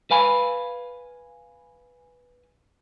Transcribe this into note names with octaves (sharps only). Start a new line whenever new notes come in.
B4 F5 G#5 B5